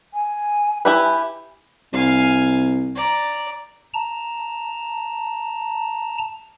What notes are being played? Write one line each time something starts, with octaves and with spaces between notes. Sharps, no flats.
G#5
E4 G4 B4
C2 F5 G#5
D5 A#5
A5 A#5